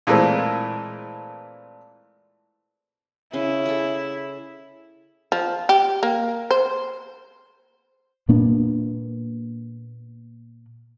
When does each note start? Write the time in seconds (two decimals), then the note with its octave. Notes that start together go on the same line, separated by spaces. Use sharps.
0.07 A#2 E3 G#3 A3 C4
3.33 C#3 C#4 E4
3.66 G#4 A4
5.32 F3
5.69 G4
6.03 A#3
6.51 C5
8.29 A#2 A#3 B3 D4